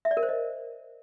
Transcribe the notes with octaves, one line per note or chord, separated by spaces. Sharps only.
E5
D5
A#4
C5
D#5